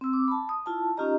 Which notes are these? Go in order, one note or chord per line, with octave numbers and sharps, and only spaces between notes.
C4 E6
D6
A5 B5
D#6
E4 F4 A5
C#4 D#4 F4 G4 D#5 A#5